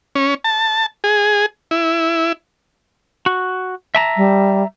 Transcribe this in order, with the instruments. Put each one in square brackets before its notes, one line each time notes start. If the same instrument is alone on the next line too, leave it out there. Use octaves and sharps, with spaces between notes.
[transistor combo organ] C#4
A5
G#4
E4
[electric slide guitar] F#4
E5 A5 A#5
[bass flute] G3